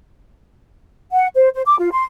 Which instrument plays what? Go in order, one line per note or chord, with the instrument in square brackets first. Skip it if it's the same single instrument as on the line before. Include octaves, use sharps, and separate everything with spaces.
[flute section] F#5
C5
C5
D6
F4
C6